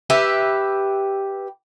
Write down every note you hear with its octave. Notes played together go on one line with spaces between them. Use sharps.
G4 B4 E5